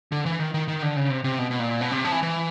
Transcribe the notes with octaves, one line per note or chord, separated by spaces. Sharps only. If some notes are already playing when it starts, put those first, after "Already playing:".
D3
E3
D#3
D#3
D#3
D3
C#3
C3
C3
B2
B2
A#2
B2
C3
F3
E3
E3